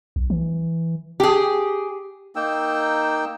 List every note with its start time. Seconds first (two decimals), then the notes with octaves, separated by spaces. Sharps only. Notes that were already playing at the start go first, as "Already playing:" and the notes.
0.16 B1
0.30 E3
1.20 G4 G#4
2.36 A#3 D#4 G5 E6